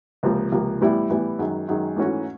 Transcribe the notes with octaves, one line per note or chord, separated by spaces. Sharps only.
C#2 C3 F3 A#3
C#2 C3 F3 A#3
A2 E3 G3 B3 E4
A2 E3 G3 B3 E4
F#2 D#3 G#3
F#2 D#3 G#3
G#2 E3 A3 C#4 F#4